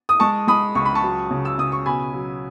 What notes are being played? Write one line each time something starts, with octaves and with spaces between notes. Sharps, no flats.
D#6
G#3 A5 C#6
G#3 B5 D#6
C#2 C#6
B5
A5 C#6
F#3
C#3
E6
C#3 D#6
C#6
B2 G#5 B5
F#3